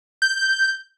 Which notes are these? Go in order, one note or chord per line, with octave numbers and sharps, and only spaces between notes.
G6